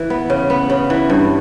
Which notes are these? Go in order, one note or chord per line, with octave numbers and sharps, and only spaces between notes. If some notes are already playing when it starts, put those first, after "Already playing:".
Already playing: E3
B3
C#3
B3
C#3
E3
G2